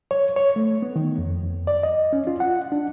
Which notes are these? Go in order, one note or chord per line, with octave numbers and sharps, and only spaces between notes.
C#5
C#5
A3
B3
D#3
F2
D5
D#5
C#4
F4
F#5
D4